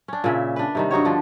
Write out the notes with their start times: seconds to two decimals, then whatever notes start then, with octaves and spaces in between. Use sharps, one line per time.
0.08 C#4 D4
0.24 A#2 C#3 E5
0.56 D4 B4
0.75 C3 D#3 G3
0.91 G2 D#4 F#4 C#5
1.05 D3 F3 D4